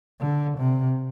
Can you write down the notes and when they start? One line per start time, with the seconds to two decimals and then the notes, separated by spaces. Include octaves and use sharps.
0.20 D3
0.58 C3